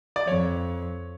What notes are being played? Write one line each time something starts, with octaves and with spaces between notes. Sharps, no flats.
D5
F2 C#5